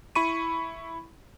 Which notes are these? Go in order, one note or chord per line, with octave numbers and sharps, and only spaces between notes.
E4 B5 C#6 D#7